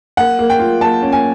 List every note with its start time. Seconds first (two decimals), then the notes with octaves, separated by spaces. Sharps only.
0.17 A#3 F#5
0.39 A#3
0.50 G5
0.59 F4
0.81 A#3 A5
1.03 C#4
1.12 G#5